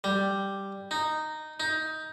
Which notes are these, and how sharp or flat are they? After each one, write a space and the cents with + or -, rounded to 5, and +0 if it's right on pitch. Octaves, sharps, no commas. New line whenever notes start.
G3 +0
D#4 -10
D#4 +15